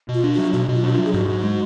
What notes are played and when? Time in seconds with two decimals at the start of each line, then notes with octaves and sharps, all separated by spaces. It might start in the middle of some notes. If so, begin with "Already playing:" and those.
0.08 B2
0.14 F4
0.24 D4
0.33 F#3 F#4
0.53 B2 F#4
0.68 B2
0.73 F4
0.83 D4 F#4
0.93 F4
0.98 F#3
1.05 G#4
1.13 G#2 F#4
1.28 G#2
1.43 G#3